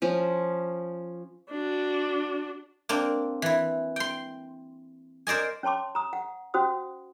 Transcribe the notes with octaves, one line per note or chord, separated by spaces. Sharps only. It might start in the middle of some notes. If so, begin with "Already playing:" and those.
F3 C#4
D4 F#4
A#3 C4 D4
E3 E4
G5 C6
A#4 C5 D5 D#5 G#5
C#4 C#5 A5 C6 D6
A#5 D#6
F#5
C#4 F#4 C5 F#5 D#6